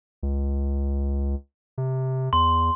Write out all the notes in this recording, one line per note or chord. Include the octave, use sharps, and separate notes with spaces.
C#2
C3
E2 C6